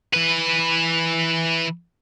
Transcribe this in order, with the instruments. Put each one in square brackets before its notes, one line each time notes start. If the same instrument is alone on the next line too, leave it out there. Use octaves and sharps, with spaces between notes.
[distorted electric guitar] E3 B4